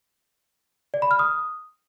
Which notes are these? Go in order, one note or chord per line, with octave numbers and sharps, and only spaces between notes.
D5
B5
F6
D#6